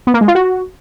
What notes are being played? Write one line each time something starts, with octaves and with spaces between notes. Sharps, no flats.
B3
A#3
G#3
F4
F#4